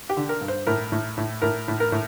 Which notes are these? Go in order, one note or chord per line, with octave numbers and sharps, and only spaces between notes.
G4
D3
A#4
G2
C5
A2 A#4
A2
A2
A2 A#4
A2
A#4
A2